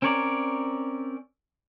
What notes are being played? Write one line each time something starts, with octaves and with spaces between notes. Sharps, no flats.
C4 C#4 A#4 C#5 D5